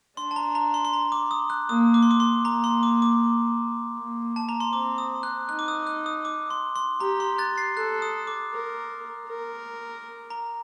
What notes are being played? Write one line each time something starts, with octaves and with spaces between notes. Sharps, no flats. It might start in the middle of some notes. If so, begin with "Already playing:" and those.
D4 C6
A5
A#5
A#5
C6
C6
A#5
D6
D#6
F#6
A#3 D#6
D6
C6
D6
C6
A#3 A#5
C6
D6
D6
A#3
A5
A#5
C6
C4 D6
D#6
F#6
D#4 F#6
D6
D#6
F#6
D#6
D6
C6
C6
G4 A#5
C6
F#6 A6
A6 C7
A4 F#6
D#6
D6
A#4
A#4
A#5